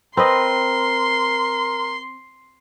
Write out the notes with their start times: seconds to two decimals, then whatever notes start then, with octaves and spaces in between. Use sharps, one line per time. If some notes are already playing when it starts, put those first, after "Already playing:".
0.17 C4 A#4 B4 D#5 C6